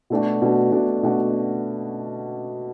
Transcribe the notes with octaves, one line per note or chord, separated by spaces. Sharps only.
B2 A3 D4 F#4
B2 A3 D4 F#4
B2 A3 D4 F#4
B2 A3 D4 F#4